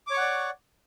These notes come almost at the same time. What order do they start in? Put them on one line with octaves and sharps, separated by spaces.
D6 C#5 C#6 F#5 D5